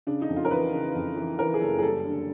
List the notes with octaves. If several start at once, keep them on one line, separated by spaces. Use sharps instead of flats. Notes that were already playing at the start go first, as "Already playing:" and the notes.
C#3 D4
D#4
F2
F4
A#4
E3 B4
C#3
F2
E3
E3 A#4
G#4
F#1 A4
G#4
G3 A4
D3